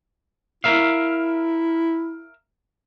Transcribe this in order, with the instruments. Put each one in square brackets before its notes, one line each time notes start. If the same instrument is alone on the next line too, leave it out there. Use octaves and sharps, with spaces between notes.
[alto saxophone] E4 [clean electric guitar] A#4 E5 F5